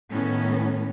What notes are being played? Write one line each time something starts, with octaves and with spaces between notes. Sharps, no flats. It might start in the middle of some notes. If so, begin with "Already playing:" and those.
A2 D#3 B3 C#4